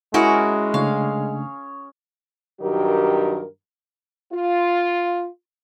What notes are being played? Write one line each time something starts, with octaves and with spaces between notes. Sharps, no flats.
G#3 C#4 E4 F#4 G#4 A#4
C#3 A3 D4 C#5 F5
G2 D#3 F#3 G4 A#4
F4